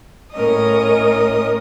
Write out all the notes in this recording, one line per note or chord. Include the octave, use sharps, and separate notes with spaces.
A2 C#4 A#4 D#5 D#6